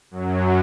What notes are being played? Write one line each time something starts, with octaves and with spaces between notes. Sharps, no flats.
F#2 F#3